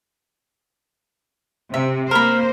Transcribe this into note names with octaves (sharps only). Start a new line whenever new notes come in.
C3 E5
A#3 A#4 C5 B5